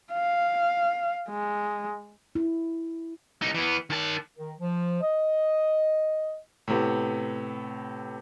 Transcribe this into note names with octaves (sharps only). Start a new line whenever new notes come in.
F5
G#3
E4
C2 D#4
E3 B3
D#3 A5
D#3
F3
D#5
A2 C3 B3